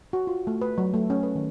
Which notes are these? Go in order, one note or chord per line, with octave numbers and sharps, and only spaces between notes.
F#4
F4
A3
B4
F#3
A3
C#4
B4
D#3